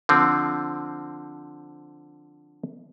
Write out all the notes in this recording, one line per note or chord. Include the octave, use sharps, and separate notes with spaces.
D3 F3 C4